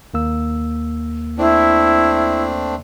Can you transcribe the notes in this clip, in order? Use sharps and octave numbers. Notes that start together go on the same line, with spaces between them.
D#2 A#3 E6
A3 C4 D4 E4